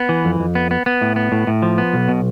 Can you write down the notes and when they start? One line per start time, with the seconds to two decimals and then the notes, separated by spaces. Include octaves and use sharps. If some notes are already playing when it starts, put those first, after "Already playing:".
Already playing: B3
0.09 E3
0.25 F2
0.40 F2
0.55 B3
0.71 B3
0.86 B3
1.01 A2
1.16 B3
1.32 A2
1.47 A2
1.62 F3
1.78 B3
1.93 B1
2.08 B2